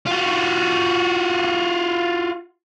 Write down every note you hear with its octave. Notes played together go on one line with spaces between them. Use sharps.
F4 F#4